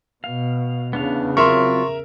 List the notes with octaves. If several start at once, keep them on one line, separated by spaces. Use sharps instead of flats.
B2 F5
E2 C#3 B3 D4 F5
F#3 C4 F4 A#4 E5 C6 C#6